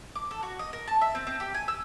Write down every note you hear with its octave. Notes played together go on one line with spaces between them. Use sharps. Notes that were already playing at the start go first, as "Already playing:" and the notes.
D6
A4
F#4
D#5
A#4
A5
E5
C4
C4
G4
G#5
E6